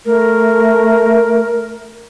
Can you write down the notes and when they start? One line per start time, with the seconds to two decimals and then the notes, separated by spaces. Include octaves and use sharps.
0.05 A3 A#4